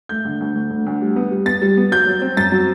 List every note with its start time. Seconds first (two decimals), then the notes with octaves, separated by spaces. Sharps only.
0.09 A3 G6
0.25 D3
0.40 D2
0.56 D2
0.71 D3
0.86 D2
1.01 G3
1.16 B3
1.31 G3
1.46 B3 A6
1.62 G3
1.77 B3
1.91 F#3 G6
2.07 F#3
2.22 C4
2.37 F#2 A6
2.52 F#3